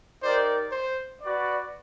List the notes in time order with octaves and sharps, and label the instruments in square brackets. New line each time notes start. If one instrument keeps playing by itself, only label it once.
[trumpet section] D#4 G4 A#4 D5 [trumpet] C5
[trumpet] C5
[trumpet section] F#4 B4 D5